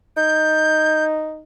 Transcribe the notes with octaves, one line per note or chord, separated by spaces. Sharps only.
D#4 G6